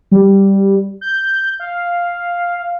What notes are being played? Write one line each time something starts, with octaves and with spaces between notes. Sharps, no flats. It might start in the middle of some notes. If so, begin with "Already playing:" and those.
G3
G6
F5